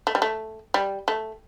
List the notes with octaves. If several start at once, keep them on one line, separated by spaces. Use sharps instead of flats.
A3
G3
A3
G3
A3